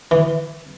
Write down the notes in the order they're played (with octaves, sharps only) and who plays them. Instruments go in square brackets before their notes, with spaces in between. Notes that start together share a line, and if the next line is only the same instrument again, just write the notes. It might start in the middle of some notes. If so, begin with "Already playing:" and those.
[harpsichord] E3